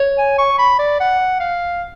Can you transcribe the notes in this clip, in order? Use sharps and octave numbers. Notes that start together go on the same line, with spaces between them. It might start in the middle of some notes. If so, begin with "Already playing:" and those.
Already playing: C#5
G#5
C#6
B5
D5
F#5
F5